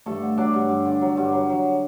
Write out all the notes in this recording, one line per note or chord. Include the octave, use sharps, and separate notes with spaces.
G2 A3 A4
D3
F#3 D4 D5
G2
G2
D3
F#3
G2
F#3
F#3